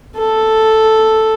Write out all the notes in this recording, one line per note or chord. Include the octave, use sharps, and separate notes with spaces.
A4